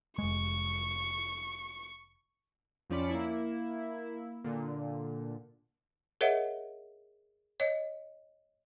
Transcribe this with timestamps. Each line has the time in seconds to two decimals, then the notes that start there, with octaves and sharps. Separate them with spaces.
0.18 F1 G#3 C#6
2.90 F2 F3 C#4 D5 B5 C#7
3.10 A#3 E4
4.44 A#2 D3
6.21 G#4 A#4 C#5 D#5 E5 F#5
7.60 C#5 D#5